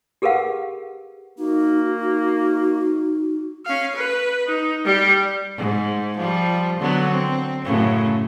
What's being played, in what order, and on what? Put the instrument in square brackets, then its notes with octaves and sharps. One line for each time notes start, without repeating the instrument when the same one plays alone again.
[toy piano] G4 G#4 A#4 B4 F5 F#5
[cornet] A#3 [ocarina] D#4 [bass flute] F#4
[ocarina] D#4
[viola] C#4 F5
B4
D#4
G3 G4
[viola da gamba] G#2
F3 G3
D3 F#3 B3
C4
F#2 A2 C#3